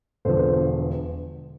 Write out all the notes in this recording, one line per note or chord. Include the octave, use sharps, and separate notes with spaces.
E1 E2 D3 F3 A4 C5